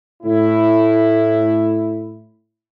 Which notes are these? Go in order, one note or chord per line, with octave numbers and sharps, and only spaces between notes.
A2 E4